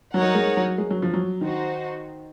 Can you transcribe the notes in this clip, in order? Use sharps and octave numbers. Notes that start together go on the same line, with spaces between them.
F#3 D#4 A#4 C#5 F#5
G#3
F#3
G#3
F#3
F3
F#3
D#3 D#4 F#4 C5